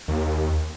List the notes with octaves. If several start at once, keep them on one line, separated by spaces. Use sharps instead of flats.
D#2